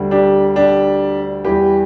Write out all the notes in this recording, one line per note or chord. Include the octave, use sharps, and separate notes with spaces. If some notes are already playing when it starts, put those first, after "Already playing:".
Already playing: D2 D3 G3
D4 G4
D4 G4
E2 E3 G3 G4 B4